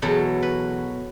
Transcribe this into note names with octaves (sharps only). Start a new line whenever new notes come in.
E2 B2 F#3 A4
B4